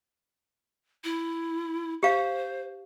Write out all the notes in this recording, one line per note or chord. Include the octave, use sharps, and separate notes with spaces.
E4
G4 C5 F5